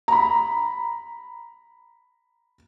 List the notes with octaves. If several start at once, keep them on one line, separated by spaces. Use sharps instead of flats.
A#5 B5